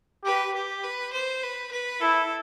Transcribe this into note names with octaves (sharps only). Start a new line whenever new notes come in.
G4 B4
G4
B4
C5
B4
B4
E4 A4